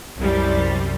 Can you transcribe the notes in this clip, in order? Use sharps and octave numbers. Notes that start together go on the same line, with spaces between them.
C2 F#2 C3 G3